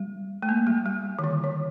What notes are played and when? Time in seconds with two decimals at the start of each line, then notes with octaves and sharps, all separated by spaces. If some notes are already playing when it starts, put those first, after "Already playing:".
Already playing: G3
0.43 A3
0.49 A#3
0.67 G3
0.86 G3
1.19 D#3
1.24 D3
1.44 D#3